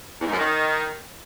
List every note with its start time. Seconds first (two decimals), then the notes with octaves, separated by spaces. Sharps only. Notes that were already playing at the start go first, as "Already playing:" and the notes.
0.21 E2
0.27 G#2
0.33 F#2
0.39 D#3